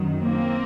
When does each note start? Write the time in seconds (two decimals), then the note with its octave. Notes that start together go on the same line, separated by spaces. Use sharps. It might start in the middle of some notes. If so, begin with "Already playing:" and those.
Already playing: F#2 D#3 F#3
0.22 A#3 C4